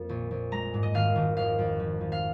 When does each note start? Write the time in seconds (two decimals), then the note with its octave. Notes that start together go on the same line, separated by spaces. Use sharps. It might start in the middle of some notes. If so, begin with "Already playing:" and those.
Already playing: F2 A#3
0.09 A#1
0.31 A#1
0.52 G#3 A#5
0.74 G#2
0.83 D#5
0.94 G#1 F5
1.16 G#1
1.37 F2 F5
1.58 F2
1.80 F3
2.01 F3
2.12 F5